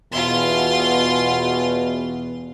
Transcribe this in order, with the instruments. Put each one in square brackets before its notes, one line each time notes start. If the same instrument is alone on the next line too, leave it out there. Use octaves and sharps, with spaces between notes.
[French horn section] E2 B2 [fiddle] F4 C6